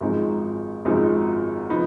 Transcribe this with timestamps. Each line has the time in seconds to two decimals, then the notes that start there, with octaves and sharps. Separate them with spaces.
0.01 G#1 F#2 F3 G#3 D#4
0.85 G#1 F#2 F3 G#3 D#4
1.70 F3 B3 D#4